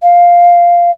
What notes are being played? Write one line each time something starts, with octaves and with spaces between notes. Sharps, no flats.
F5